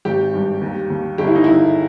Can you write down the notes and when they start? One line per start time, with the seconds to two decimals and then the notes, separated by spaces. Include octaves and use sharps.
0.05 G#1 G4
0.34 G2
0.61 D#2
0.90 D#2
1.18 G1 G4
1.27 E4
1.35 D#4
1.44 G1 E4